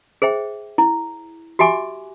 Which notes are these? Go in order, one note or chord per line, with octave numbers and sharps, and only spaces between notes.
G#4 C5 E5 G5
E4
F#4 G4 E5 G#5 D6